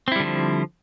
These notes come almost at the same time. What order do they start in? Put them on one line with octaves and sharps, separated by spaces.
C4 E4 G3 D3 F3